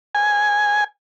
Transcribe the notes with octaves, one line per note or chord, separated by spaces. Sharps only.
G#5